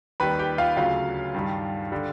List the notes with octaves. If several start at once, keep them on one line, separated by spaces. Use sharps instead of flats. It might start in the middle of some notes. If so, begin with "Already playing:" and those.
D#2 D#3 G3 B4 B5
G4 G5
F4 F5
D2 C#3 F#3 F4 F5
G2 D#3 G3
D3 G3